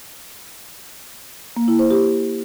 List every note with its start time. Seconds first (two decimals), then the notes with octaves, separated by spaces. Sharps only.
1.57 A#3
1.68 E4
1.79 C5
1.91 G4